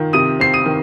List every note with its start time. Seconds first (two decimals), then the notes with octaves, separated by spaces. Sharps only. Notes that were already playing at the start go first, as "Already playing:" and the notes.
Already playing: D#3 F4
0.13 C3 D#6 D#7
0.40 C4 C7
0.54 D#6 D#7
0.66 D#3